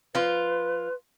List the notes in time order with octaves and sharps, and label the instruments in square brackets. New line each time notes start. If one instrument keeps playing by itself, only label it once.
[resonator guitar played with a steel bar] F3 F4 [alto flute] B4